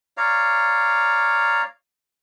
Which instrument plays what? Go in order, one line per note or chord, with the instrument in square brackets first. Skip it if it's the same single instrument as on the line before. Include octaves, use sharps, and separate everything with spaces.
[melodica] C#5 D5 F5 A#5